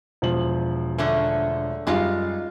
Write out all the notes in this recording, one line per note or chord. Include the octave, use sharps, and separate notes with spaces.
E1 F3 F#7
D3 A3 C#4
F#2 G3 G#3 D#4 F4 F5